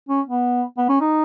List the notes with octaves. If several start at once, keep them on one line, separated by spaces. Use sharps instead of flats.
C#4
B3
B3
C#4
D#4